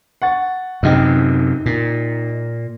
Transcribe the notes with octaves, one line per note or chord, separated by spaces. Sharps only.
F#5 C#6 A6
F#2 C3 D#4 D#5 G5
A#2